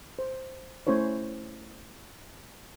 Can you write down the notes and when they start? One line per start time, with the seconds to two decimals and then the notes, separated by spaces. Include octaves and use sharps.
0.19 C5
0.87 A3 C#4 E4 C5 C#5